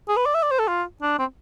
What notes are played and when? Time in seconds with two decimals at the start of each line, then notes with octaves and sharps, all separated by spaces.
0.09 G#4
0.17 B4
0.26 D5
0.35 E5
0.43 D5
0.51 C5
0.59 A4
0.68 F4
1.02 D4
1.19 C4